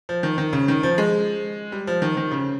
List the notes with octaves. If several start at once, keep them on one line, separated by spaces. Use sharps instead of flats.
F3
D#3
D#3
C#3
D#3
F3
G#3
G3
F3
D#3
D#3
C#3